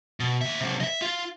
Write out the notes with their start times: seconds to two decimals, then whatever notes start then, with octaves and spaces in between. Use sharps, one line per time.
0.20 B2
0.41 D#2 E5
0.61 C3 F#3
0.80 D#5 E5
1.02 F4